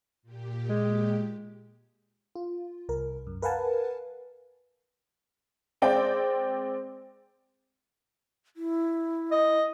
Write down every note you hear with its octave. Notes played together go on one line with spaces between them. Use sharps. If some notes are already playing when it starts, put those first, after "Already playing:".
A#2 G4
G#3
F4
C2 A#4
F#2
A#4 B4 F5 F#5 G#5 A5
G#3 C4 D5 G5
E4
D#5